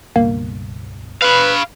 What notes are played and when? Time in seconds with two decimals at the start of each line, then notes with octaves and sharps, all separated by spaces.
0.16 C#2 G2 B2 A#3
1.22 B4 F5 B5